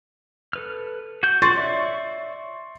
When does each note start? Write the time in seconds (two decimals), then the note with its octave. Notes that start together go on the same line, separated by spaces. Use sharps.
0.53 A4 B4 F6
1.23 F#4 G6
1.42 F4 F#4 C6 C#6 A6
1.56 C#5 D5 E5